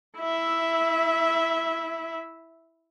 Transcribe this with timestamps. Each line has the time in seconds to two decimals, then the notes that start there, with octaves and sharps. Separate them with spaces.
0.18 E4 E5